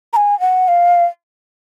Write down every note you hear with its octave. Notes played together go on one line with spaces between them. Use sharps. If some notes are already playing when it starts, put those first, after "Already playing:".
A#5
G#5
F#5
F5